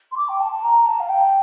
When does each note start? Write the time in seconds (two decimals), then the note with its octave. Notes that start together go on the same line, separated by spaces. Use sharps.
0.12 C6
0.17 D6
0.29 G5
0.40 A5
0.52 A5
0.63 A#5
0.86 A5
1.00 F5
1.09 G5